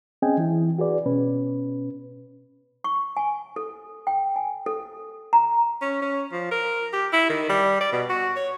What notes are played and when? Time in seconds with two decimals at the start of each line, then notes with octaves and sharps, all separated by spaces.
0.22 C4 C#4 G#4 D#5 G5 G#5
0.37 E3 E4
0.79 F#4 G#4 B4 D5
1.06 B2 C#4 B4
2.84 C#6
3.17 G#5
3.56 A4
4.07 G5
4.36 G#5
4.66 A4
5.33 A#5
5.82 C#4
6.02 C#4
6.32 F3
6.51 A#4
6.93 G4
7.13 E4
7.30 D#3
7.49 G3
7.81 D5
7.92 B2
8.10 F#4
8.36 C#5